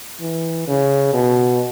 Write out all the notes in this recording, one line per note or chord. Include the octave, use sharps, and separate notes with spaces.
E3
C#3
B2